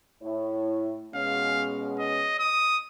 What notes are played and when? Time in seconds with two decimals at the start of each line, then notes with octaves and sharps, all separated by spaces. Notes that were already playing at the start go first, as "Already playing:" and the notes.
0.23 A2 E4 C#5
1.15 B2 G#3 C#4 F5
1.99 D#5
2.39 D#6